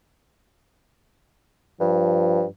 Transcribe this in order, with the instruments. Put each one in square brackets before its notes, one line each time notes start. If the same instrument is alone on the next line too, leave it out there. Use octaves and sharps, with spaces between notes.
[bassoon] G2 [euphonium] F3